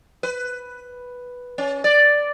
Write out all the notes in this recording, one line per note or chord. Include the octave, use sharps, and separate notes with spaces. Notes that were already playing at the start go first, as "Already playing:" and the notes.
B4
C#4
D5